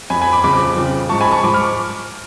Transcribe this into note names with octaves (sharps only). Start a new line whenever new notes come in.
F2 F3 G#5 B5
G#5 B5
B5 D6
F2 C#3 F3 B5 D6
F2 C#3 F3
G#2 F3 A5 C#6
G#5 B5
A5 C#6
G#2 F3 B5 D6
C#6 F6